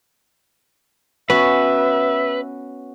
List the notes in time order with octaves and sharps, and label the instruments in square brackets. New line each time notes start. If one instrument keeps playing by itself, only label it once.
[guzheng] B3 C#4 F#4 [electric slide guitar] B4 [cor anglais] E5